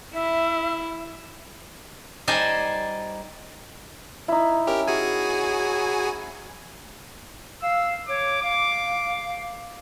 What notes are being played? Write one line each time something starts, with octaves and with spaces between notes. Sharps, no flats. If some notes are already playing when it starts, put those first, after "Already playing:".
E4 E5
G3 D#4 C5 D5 G#5 A5
D#4 E4
C#4 G4 A#4
F#4 G#4 G#5
F5 E6
C#5 D6
F5 D6